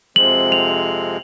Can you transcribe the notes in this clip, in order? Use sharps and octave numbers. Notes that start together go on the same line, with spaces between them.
F2 C3 F3 G#3 C4 F#7
F7